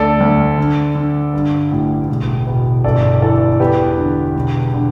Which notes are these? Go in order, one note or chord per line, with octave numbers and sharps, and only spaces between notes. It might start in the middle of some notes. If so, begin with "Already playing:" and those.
Already playing: D2 A4 D5
D2
D3
D3
G2
A1
E1
B2
G1 A4 D5
E3 A4 D5
E2 G4 B4
D3
E1
D3